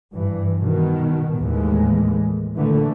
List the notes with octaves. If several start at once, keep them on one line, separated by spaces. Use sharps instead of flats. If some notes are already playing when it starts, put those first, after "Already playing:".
G2 E3
B2 D#3
D#2 A2 E3 G#3
A#2 D3 E3 A3